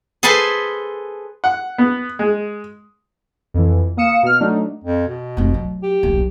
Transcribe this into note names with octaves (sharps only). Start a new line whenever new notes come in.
G#4 A4 B4 C5 G#5 A5
F#5
B3
G#3
F2 E3
A#3 F5 D#6 C#7 E7
B2 F6
F#3 A3 D4 D#4
F2
B2
F1 C4
F#3
G4
D#1 B1